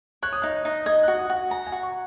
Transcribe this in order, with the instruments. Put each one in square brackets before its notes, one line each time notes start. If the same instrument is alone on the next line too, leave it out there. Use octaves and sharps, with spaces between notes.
[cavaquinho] C#5 [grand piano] F#6
[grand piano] D#6
[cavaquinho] D#4 [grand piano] F#6
[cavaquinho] D#4
[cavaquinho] D#5 [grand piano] G#6
[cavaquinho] F#4 [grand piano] F#6
[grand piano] D#6
[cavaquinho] F#4 [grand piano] F#5
[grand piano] G#5 [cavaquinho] A#5
[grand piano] G#5
[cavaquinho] F#4
[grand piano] C#6